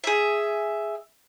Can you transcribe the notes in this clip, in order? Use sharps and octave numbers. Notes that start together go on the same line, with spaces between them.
G#4 E5